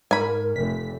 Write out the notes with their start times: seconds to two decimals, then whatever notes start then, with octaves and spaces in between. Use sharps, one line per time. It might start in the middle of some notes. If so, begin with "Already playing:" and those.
0.11 G#2 A#4 G#5 B5
0.56 F1 B6